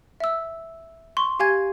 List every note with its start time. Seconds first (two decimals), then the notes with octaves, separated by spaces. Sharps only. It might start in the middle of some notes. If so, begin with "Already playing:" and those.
0.20 E5 E6
1.17 C6 C#6
1.39 G4 F5 G#5 G#6